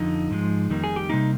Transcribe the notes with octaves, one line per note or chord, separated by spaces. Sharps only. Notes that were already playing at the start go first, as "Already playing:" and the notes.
Already playing: F2 D3 F3 D#4
G#2 F3 G#3
F2 D#3 G3 A#3
G#4
G4
C3 G3 A#3 D#4